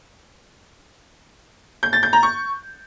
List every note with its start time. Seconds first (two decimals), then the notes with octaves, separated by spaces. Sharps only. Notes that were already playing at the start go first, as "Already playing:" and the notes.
1.83 G6
1.93 A6
2.03 G6
2.13 A#5
2.23 C#6